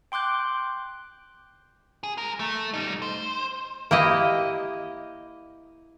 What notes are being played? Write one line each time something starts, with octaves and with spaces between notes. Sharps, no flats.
G5 C6 D6 F#6 G6
G#4
G#3 A#4
A3
G3 D#4
C5
A#3 E4 G4 D#5